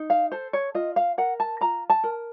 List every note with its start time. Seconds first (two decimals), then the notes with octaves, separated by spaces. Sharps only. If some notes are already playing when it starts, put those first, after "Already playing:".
Already playing: D#4
0.10 F5
0.32 A4 C5
0.53 C#5
0.75 F4 D#5
0.96 F5
1.18 A#4 F#5
1.40 A5
1.61 F4 A#5
1.90 A5
2.03 A#4